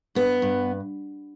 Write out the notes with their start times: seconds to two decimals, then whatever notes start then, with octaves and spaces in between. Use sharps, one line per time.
0.15 G2 B3
0.42 G2